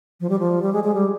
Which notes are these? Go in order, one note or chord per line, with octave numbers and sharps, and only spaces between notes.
F3
G3
F3
G3
G#3
G#3
G3